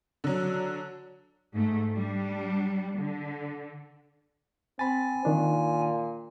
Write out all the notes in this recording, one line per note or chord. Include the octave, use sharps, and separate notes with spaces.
D3 F#3
G#2 A3
G3 D4
D3
C4 G#5 B5 A6
A#2 D#3 D4